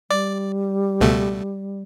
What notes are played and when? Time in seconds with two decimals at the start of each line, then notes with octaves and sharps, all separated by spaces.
0.11 G3 D5
1.01 C#2 B2 A3